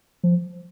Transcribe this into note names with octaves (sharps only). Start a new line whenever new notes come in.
F3